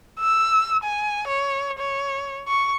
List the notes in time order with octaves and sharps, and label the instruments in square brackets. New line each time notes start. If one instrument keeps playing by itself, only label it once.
[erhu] E6
G#5
C#5
C#5
C#6